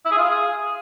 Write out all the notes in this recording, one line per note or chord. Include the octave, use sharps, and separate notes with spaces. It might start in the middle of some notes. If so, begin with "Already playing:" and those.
E4
G#4
F4
F5
G#4